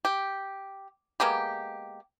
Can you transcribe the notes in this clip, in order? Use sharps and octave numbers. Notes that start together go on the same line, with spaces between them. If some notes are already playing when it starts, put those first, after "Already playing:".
G4
G#3 A#3 B3 G4